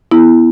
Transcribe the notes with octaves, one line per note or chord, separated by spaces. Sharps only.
B3 E4